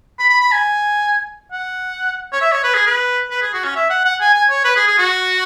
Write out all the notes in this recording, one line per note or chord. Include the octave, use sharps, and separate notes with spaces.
B5
B5
B5
G#5
F#5
C#5
E5
C#5
B4
G#4
B4
B4
G#4
F#4
C#4
E5
F#5
F#5
G#5
G#5
C#5
B4
G#4
G#4
F#4